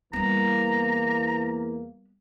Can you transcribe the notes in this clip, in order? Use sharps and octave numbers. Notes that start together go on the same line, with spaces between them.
E2 E3 G3 A#3 B3 A#5